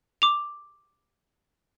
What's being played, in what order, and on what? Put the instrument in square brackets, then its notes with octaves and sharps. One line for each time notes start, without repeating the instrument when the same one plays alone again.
[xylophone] D6 F7